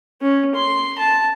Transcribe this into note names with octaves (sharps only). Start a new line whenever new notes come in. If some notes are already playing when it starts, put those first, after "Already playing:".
C#4
C6
A5